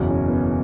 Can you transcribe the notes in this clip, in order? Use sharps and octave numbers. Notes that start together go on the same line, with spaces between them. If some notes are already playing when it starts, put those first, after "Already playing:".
Already playing: F#1 E2 B2 F#3 C#4
C#4
B3
C#4